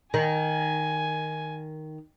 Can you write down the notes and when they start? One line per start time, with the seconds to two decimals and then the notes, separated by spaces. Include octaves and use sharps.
0.14 D#3 G#5